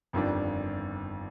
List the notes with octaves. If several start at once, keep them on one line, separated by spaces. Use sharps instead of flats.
G1 F2 D#3 G3 D4